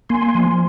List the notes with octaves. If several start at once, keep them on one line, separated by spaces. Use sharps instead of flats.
A#3 G#5 C6
F3